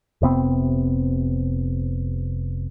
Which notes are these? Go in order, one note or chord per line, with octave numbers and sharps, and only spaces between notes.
F1 C3 B3 C4